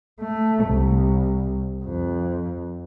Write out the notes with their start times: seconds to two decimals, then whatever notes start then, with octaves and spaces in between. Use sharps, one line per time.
0.21 A3
0.65 C2
1.84 F2